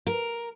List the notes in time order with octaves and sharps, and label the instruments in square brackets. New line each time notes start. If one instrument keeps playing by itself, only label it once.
[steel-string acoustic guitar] A#4